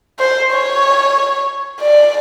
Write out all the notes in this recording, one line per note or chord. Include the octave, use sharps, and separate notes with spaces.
C5
C#5
D5